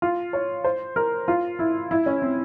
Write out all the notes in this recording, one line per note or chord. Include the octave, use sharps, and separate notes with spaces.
F4
C#5
C5
A#4
F4
E4
E4
C#4
C4